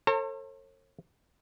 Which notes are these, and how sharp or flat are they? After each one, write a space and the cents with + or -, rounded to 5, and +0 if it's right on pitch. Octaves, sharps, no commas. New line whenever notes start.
A4 +40 C#5 -45 A#5 -40